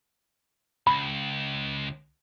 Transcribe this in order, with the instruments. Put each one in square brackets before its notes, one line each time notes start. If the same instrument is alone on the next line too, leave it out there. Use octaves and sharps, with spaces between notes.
[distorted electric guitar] C#2 [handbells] B5